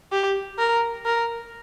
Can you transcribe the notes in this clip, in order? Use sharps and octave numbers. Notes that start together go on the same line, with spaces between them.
G4
A#4
A#4